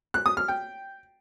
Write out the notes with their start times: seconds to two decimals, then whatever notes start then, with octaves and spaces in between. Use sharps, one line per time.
0.14 F#6
0.26 D#6
0.37 F6
0.48 G5